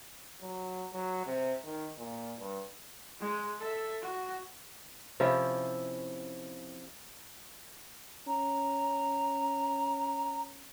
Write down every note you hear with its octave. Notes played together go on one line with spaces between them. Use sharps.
F#3
F#3
C3
D#3
A#2
G2
G#3
A4 E5
F#4
C3 F3 C#4 E4
C#4 A#5